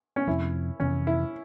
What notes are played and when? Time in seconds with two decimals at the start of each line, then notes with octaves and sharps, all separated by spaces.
0.16 C#4
0.27 F2 C3 F3 C4 E4
0.80 F2 C3 E3 C#4
1.07 E4